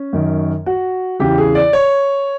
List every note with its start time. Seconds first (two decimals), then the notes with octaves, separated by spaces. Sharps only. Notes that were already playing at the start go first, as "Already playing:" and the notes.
Already playing: C#4
0.13 F#2 D#3
0.66 F#4
1.19 E2 C#3 E3 G4
1.38 G#4
1.55 D5
1.73 C#5